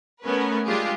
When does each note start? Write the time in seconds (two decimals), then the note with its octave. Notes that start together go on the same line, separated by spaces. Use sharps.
0.23 A3 B3 C#4 A#4 B4
0.66 G3 G#3 D4 F4 G4 G#4